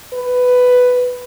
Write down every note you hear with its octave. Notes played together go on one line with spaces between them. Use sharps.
B4